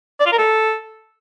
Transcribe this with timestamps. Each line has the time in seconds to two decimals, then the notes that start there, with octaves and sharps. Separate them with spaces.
0.20 D5
0.26 F4
0.32 A#4
0.38 A4